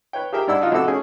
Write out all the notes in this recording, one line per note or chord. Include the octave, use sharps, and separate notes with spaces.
B4 C#5 G5
G4 G#4 A#4 E5 G5 A#5
G2 D4 E4 D5 F#5 E6
D4 D#4 F4 F#4
A#1 C3 F#4 A4 E6
A3 C#4 G#4 A4